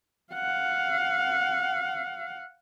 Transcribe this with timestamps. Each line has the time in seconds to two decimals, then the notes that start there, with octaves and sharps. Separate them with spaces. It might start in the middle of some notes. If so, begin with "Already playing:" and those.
0.33 F5 F#5